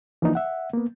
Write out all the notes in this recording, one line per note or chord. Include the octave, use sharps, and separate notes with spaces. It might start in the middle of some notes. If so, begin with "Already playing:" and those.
E3 F3 A#3 D4 D#4
E5 F#5
A#3 B3